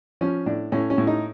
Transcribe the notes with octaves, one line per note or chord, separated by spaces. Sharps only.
F3 C#4
A2 D4
A2 C#4
C#4
A2
D#4